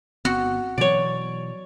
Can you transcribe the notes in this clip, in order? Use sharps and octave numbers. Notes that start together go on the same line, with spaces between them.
G1 B3 C4 F#4
B2 E3 F#3 C#5 D5